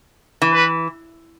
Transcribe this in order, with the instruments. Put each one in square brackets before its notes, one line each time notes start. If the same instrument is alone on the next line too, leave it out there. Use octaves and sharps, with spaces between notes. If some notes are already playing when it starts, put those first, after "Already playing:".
[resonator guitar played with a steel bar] E3
[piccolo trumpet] B4